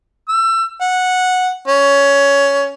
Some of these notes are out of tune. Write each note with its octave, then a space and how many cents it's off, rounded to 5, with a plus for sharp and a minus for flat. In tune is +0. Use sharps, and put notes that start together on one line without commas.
E6 +25
F#5 -10
C#4 +15